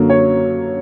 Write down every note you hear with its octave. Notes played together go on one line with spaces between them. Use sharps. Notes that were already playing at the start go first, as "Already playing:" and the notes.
Already playing: F#2 D3 F#3 A#3
C#5